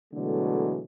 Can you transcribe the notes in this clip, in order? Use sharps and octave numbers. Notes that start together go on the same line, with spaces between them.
B2 D3 E3 F#3 G#3 A3